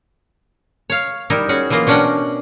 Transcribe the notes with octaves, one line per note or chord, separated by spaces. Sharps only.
C#5 F5
G3 D#4 E4 A#4
C#4 F#4 G#4
E3 F#3 A#3 F4 D#5
B2 C#4 D4 A#4 F#5 G5